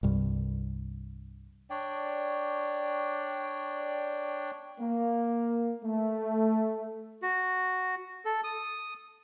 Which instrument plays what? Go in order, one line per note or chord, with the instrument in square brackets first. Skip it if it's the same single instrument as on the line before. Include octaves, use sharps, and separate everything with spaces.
[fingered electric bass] C2 G2
[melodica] D4 C#5 D5 G5
[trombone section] A#3
A3
[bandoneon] F#4
A4
D#6